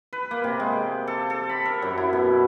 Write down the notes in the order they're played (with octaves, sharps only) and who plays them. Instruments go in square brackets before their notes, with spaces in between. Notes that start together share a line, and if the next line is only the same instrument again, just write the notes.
[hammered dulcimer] B4
A#3
C3
G#3
G5
A4
A4
B5
A#4
F#2
E4
B2